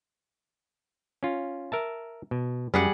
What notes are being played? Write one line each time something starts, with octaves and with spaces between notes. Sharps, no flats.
C#4 F4
A#4 E5 A5
B2
F#2 G3 G#4 F#5